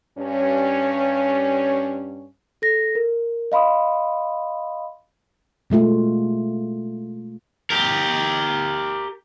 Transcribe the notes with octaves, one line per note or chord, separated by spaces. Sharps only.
G2 C#4
A4 A#6
A#4
D#5 F5 B5 C6 D#6
B2 G#3 A3 F4
G4 A#4